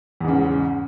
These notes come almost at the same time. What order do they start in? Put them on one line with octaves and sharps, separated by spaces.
E2 G#2 C#3